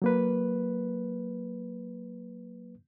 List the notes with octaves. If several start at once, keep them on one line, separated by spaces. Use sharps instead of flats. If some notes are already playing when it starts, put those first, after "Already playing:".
F#3 A#3 B4